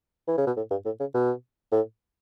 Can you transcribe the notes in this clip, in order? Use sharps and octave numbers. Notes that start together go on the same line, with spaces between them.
E3
C#3
B2
A2
G2
A2
C#3
B2
A2